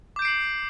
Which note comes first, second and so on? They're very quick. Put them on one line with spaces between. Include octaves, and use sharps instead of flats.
D6 G6 D7 C7 F#7